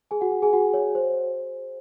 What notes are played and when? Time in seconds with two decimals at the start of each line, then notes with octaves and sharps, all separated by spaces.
0.11 G#4 G#5
0.21 F#4 F#5
0.32 F#4 F#5
0.42 G#4 G#5
0.53 F#4 F#5
0.74 C#5
0.95 C5